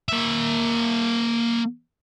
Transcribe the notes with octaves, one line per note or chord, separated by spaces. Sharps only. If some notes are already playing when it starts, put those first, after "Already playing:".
A#3 E5